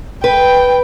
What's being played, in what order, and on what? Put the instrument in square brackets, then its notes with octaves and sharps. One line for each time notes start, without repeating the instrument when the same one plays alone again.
[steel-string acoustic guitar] B4 [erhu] G5